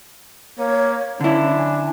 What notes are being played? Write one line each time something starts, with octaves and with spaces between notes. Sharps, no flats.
A#3 C#5
D3 C#4 D4 E4
G#5